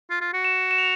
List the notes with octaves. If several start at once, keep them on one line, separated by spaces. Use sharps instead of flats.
F4
F4
F#4
E7
E7
F7